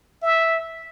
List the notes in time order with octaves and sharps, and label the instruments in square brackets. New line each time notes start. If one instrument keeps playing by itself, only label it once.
[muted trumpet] E5